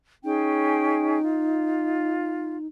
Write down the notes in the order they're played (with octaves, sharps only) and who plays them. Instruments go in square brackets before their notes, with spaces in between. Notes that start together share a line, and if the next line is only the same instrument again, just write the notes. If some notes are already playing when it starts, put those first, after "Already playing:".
[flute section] C#4 G#4 G5 [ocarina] D#4
[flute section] F4